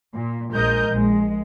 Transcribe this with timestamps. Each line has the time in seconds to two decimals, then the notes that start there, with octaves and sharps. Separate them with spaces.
0.15 A#2
0.53 A#1 G#3 A#4 D#5 G6
0.89 A#1 G#3